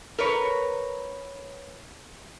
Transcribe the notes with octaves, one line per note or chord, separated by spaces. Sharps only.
A#4 B4 C#5